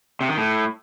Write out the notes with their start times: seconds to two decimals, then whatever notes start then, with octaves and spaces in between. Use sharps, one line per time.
0.21 C3
0.29 D#3
0.37 A2